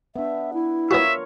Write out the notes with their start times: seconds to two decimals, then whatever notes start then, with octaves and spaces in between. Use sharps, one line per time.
0.16 B3 D4 E5
0.54 E4
0.91 B3 F4 F#4 A#4 C#5 E5